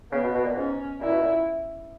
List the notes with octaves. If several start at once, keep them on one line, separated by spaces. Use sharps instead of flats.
C#3 B3
B2
B2
A#2
G#2 C#4
A#2 E4
B2
A#2